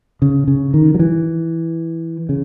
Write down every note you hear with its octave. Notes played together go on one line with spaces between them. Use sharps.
C#3
C#3
D#3
F#3
E3
C#3